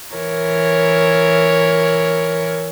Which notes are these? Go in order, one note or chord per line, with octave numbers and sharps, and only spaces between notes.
E3 A#4 C#5